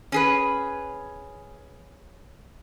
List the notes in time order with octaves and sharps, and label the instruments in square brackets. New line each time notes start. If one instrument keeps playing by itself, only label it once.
[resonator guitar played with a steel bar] C#4 G#4 B4